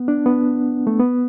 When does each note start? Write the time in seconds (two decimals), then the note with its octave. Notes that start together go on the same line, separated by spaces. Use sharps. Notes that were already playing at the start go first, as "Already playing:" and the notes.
Already playing: B3
0.08 D4
0.26 B3
0.87 A3
0.99 B3